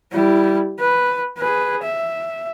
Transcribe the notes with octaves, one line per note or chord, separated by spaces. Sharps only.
G3 E4
B4
G#4 B4
E5